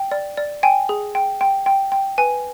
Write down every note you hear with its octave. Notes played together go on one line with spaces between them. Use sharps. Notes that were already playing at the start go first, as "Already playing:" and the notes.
Already playing: G5
D5
D5
G5 G#5
G#4
G5
G5
G5
G5
B4 G#5